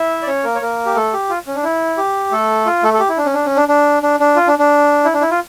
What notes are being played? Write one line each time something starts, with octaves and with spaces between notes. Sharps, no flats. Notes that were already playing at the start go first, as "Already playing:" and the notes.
Already playing: E4 E5
D5
C#4 C#5
A#3 A#4
C#5
A#3 A#4
G4
A3 A4
G4
F4
C#4
D4
E4
G4
A3 A4
F4
A3 A4
A4
G4
E4
D4
C#4
D4
C#4
D4
D4
D4
D4
F4
D4
D4
E4
D4
E4
F4